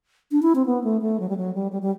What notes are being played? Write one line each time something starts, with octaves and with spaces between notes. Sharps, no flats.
D4
E4
C4
B3
A3
A3
F#3
G3
F#3
G3
G3
G3